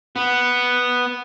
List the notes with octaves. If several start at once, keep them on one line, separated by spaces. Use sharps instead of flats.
B3